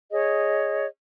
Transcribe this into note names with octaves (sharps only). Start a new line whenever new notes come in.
G#4 C#5 D#5